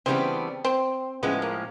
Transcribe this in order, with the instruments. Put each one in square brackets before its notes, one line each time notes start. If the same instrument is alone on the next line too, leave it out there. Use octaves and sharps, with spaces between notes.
[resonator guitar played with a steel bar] C#3 E3 G3 B3 D4 [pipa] C4
[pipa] C4
[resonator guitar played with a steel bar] A2 F3 G#3 C#4 [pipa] B3
[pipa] A#3